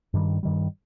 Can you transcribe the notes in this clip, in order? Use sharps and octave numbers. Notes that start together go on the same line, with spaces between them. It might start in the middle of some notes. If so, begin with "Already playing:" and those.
G2 D#3 G3
G2 D#3 G3